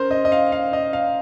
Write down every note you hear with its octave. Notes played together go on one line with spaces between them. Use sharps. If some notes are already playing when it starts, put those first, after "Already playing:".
Already playing: C#4 A#4 C5
D#5
D#5
F5
F5
D#5
F5